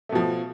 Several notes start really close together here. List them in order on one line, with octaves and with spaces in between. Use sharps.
A3 B2 F3